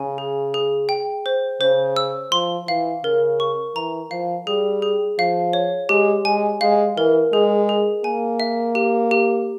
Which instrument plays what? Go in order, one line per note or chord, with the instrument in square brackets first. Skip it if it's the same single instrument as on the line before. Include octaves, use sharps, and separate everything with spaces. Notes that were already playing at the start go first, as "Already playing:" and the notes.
Already playing: [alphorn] C#3 [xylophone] G#5
[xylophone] G#4
G#4
G5
C5
[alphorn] C#3 [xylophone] C5
[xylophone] E6
[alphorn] F3 [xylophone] C6
[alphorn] E3 [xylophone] F5
[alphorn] C#3 [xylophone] A#4
[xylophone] C#6
[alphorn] E3 [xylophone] A#5
[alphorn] F3 [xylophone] F5
[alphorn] G3 [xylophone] G#4
[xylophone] G#4
[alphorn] F3 [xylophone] F5
[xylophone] C#5
[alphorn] G#3 [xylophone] G4
[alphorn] G#3 [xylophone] G#5
[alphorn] G#3 [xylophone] F5
[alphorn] E3 [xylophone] A#4
[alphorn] G#3 [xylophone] G#4
[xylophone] G#4
[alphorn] A#3 [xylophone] G#5
[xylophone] E5
G4
G4